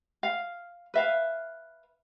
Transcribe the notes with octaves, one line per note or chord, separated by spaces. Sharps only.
F5
B4 E5 F5